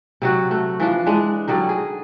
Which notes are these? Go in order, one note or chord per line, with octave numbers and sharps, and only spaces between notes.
C3 F#3 F#4
A3 F#4
E3 F3 D4
E3 G#3 D4
D3 F#3 G3 D#4
G#4